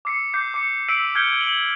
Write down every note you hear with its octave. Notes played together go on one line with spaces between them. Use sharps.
D6 E6 C7 C#7
D6 G6 C7
D6 C#7
E6 B6 C7 D7 D#7 F#7
F6 G6 G#6 C7 C#7 G7
D7 F#7